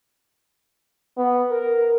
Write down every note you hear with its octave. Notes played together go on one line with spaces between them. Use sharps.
B3
A#4